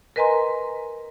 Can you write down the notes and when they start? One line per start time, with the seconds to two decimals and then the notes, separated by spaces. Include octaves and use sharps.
0.16 A#4 B4 D#5 G#5 A#5 C6